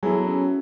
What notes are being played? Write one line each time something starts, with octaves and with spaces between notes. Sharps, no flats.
F#3 B3 E4 G#4 A4
C#4